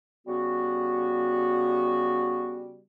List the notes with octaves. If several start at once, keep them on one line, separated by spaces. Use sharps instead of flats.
C#3 G3 B3 F#4